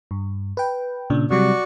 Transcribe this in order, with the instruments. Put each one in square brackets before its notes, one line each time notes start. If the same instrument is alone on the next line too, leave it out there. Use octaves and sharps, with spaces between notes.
[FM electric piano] G2
B4 G5
A#2 C#3 D4
[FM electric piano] C3 F#3 G3 [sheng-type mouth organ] F#4 D5 C#6